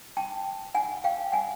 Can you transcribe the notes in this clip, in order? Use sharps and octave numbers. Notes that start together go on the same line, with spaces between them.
G5 A5
F#5 G#5
F5 G5
F#5 G#5